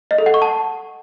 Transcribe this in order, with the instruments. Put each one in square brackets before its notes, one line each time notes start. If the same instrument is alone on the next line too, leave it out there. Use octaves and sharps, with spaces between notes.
[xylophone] D#5
A4
F#5
C#6
A5